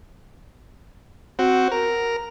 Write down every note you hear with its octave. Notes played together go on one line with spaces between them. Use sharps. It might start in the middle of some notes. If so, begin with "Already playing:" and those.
C4 F#4
A#4